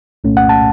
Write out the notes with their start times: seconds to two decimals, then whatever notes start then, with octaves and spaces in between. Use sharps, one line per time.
0.24 C2 A#2 A3 C#4
0.37 F#5
0.49 A5